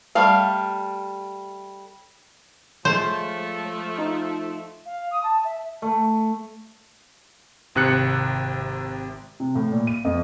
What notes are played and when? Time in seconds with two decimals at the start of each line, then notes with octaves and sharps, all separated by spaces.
0.15 G3 A3 F5
2.85 F3 G#3 A3 C5 C#5
3.98 D#4 F4
4.86 F5
5.11 D#6
5.23 A5
5.44 E5
5.82 A3
7.75 G#1 C3 F#6 C#7
9.40 C3
9.55 A2
9.71 A#2
9.87 D#7
10.05 F2